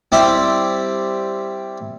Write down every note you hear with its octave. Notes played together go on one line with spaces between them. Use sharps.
G3 C4 E4 G4